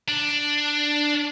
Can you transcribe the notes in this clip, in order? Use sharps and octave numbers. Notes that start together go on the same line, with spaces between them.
D4